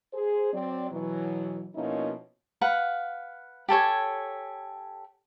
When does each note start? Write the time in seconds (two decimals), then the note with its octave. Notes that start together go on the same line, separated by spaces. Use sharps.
0.14 G#4 C5
0.53 F#3 C4 D5
0.91 B2 E3 F#3
1.75 B2 F3 A#3 C#4 D#4 E4
2.61 B4 F5 F#5
3.68 G4 A4 C#5 G#5